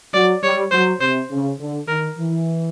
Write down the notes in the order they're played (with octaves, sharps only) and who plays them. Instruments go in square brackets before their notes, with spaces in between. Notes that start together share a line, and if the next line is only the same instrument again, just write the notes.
[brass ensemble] F#3 [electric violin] D5
[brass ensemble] G3 [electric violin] C#5
[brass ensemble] F#3 [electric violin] C5
[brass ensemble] C3 [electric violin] C5
[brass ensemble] C#3
D3
[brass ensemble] D#3 [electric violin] A#4
[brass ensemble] E3